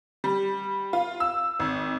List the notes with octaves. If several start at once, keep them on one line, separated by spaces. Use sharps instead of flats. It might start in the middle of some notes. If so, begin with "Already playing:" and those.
G3
F4
E6
G#1